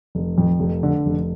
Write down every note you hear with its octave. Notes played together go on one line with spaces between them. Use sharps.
F1
F2
F1
D3
F1